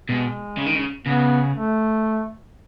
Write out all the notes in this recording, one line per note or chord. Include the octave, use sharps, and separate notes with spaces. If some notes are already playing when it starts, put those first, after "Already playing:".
B2 G#3
C#3
D#3
C#3
C#3 B3
A3